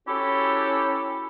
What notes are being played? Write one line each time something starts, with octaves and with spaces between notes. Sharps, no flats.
C#4 E4 F#4 G4 A4